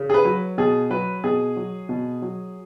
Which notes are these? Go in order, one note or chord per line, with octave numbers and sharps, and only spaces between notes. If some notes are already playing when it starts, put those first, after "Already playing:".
Already playing: C#3
G#4
B4
F#3
B2 G#4
F#3 B4
B2 G#4
F#3
B2
F#3